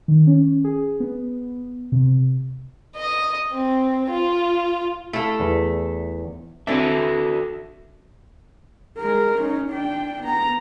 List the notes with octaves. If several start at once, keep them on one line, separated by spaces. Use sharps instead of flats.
D#3
C#4
G#4
B3
C3
D#5
C4
F4
A3 E4 A4 F5
E2
E3 C4 D4 F#4 A4 E5
G#3 A#4
C#4 D#4
D4 G5
B3 A#5